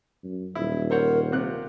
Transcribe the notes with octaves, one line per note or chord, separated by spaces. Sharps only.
F#2
D#1 E4
A#4 C5 C#5 F#5
C3 C4 F4 F#6